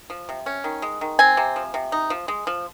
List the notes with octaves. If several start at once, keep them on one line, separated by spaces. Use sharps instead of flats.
F3
C3
C#4
D#3
G#3
D#3
C4 G#5
C3
F3
C3
D#4
F3
G#3
F3